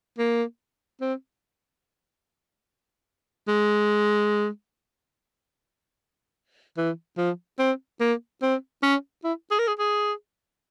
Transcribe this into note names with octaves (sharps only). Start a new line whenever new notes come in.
A#3
C4
G#3
E3
F3
C4
A#3
C4
C#4
E4
G#4
A#4
G#4
G#4